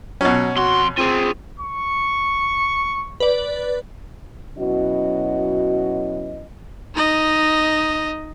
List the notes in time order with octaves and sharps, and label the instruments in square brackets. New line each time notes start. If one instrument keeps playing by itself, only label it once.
[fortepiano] B2 C#4 [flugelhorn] F#3
[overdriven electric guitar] F2 C6 [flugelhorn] F#4
[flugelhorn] C4 [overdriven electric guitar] F4 G#4
[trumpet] C#6
[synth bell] B4 D5
[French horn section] B2 F#3 C#4 E4 F#4 D#5
[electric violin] D#4 D#5